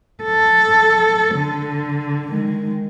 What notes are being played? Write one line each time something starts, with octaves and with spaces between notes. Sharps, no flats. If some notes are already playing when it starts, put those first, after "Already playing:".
A4
D3
D#3 G#3